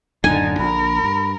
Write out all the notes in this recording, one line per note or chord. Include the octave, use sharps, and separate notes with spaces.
D1 F#2 D3 D4 D#4 G#5
A#1 D4 A#4 B5
G2